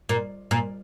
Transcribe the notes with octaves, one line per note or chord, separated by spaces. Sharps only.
A#2
A#2